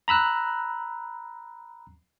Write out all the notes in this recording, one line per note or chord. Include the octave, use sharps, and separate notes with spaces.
A#5 B5 E6 F#6